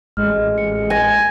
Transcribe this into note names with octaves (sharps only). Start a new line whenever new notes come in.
A1 G#3 F6
C#7
G#5 G#6 A#6 D#7